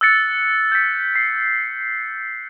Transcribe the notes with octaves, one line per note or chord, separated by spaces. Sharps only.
E6 F#6 A6 C#7
G6 B6
C7